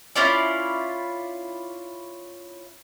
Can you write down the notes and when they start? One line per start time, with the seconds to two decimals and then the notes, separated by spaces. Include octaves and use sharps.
0.16 C#4 E4 F4 D5